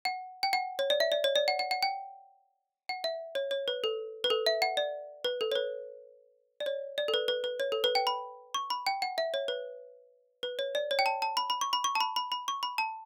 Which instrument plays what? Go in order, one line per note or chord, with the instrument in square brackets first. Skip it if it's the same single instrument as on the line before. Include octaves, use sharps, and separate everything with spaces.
[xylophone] F#5
G5
F#5
C#5
D5
E5
D5
C#5
D5
F#5
F#5
F#5
G5
F#5
E5
C#5
C#5
B4
A4
B4
A4
E5
F#5
D5
B4
A4
C#5
B4
D5
C#5
D5
A4
B4
B4
B4
C#5
A4
B4
G5
B5
C#6
B5
G5
F#5
E5
C#5
B4
B4
C#5
D5
C#5
G5
A5
A5
B5
B5
C#6
B5
C#6
A5
B5
B5
B5
C#6
B5
A5